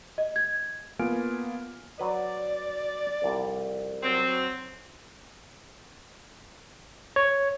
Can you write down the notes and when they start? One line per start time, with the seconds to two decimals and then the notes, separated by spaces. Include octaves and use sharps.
0.18 D#5
0.36 G#6
0.99 A#3 B3 F4 G#5 F6 D7
1.99 F#3 B4 D5
3.22 C2 F2
4.03 F#3 C4
7.16 C#5